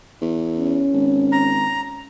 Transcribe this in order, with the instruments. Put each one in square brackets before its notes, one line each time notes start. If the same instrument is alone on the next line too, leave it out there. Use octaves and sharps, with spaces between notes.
[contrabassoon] E2
[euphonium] C#4
[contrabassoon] G#1
[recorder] A#5